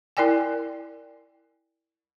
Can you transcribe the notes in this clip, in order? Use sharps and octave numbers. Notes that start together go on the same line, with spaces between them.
E4 A#4 D5 G5 G#5